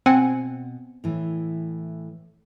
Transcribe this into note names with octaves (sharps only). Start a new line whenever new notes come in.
B2 C4 F#5 G#5
A2 E3